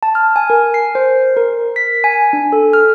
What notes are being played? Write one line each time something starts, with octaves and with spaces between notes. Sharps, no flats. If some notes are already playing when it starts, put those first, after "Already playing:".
A5
F6
G#5
A#4
C7
C5
A#4
B6
G#5
D4
A4
F6